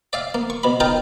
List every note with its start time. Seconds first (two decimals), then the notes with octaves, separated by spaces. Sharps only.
0.13 D5 E5 F5
0.34 A#3
0.50 C#6
0.63 B2 B5
0.80 D#4 F4 A#4 G5 A5 A#5